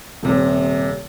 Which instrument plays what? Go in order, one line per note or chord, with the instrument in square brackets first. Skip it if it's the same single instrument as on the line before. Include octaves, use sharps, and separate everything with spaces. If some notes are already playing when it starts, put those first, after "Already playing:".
[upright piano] D#1 C3